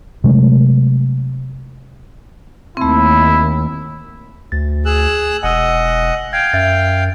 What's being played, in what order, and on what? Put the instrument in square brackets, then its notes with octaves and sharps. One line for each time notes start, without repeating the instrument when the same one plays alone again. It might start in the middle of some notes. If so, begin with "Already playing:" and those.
[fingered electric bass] C3 F#3 G#3 A3
[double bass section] D#2 [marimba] A3 C4 [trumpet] E4
[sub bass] D2 [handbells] A6
[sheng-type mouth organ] G#4 E6 F#6
[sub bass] E1 [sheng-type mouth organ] D#5 F#5 [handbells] G#5 E6
[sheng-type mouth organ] F5 G5 [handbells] G#6
[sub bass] F#2 [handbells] E5 A6